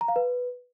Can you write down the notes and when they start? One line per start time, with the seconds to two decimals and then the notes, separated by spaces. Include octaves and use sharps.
0.01 A#5
0.08 F5
0.16 B4